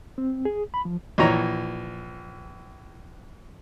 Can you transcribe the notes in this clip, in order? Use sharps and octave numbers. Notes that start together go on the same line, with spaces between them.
C4
G#4
B5
F3
A#1 E3 C#5 A#5